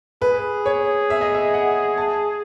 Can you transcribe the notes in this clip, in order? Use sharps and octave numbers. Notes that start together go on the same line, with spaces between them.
G#4 B4
C#5
E5
D#5
E5
F#5
A5